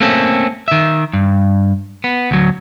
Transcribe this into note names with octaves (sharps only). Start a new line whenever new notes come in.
A3 A#3 C4 C#4 A4
D#3 E5
G2
B3
D2 F#3